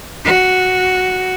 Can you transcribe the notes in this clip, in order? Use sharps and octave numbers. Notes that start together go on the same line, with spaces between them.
F#4